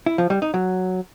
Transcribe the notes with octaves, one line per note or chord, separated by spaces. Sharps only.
E4
F3
G3
D#4
F#3